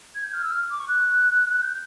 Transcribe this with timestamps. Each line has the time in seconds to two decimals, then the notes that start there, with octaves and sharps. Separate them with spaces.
0.15 G#6
0.24 G6
0.34 F6
0.43 E6
0.51 F6
0.70 D6
0.80 C#6
0.88 F#6
1.61 G6